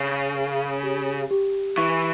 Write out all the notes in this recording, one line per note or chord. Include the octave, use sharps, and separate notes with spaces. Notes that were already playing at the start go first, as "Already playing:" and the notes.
Already playing: C#3 C#6
A#4
G4
G4
E3 C#6